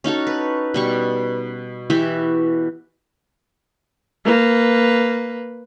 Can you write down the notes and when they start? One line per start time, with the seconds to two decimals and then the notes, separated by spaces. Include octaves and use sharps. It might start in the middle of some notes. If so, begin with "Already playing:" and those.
0.04 C#4 D#4 F#4 A4
0.27 B4
0.74 B2 G3 C#6
1.90 E3 F#4 G4 E5
4.25 A#3 B4